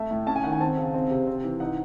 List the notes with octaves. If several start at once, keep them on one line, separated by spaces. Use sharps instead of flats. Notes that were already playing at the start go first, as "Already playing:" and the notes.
Already playing: A3 E5
A2
C#4 A5
G#5
D#3 F#5
G#5
C4 A5
C#3
C4
C3
C4
E3
D#4 F#5